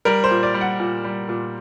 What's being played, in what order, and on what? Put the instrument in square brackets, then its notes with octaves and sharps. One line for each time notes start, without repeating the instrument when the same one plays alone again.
[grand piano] G3 A#4
C5
A#2
D5
G3
F#5
A#2
G3
A#2